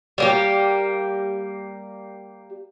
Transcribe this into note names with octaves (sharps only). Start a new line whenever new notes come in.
G3 A#3 G4